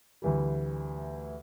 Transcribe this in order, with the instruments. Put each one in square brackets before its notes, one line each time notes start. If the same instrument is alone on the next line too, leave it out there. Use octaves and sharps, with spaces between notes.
[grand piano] D2 E3 G3